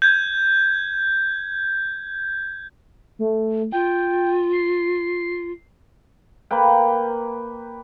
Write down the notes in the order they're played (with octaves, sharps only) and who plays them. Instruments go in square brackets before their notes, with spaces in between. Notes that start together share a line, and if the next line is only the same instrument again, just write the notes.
[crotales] G6 G#6
[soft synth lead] A3
[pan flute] F4 [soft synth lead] G5
[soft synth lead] C7
[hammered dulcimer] A#3 B4 G5